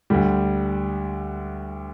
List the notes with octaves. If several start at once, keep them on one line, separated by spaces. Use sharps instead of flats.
D2 D3 G3